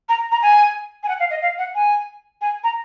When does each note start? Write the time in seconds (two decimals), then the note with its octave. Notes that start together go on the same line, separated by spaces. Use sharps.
0.09 A#5
0.31 A#5
0.42 G#5
1.03 G#5
1.08 F#5
1.19 F5
1.30 D#5
1.42 F5
1.58 F#5
1.75 G#5
2.41 G#5
2.63 A#5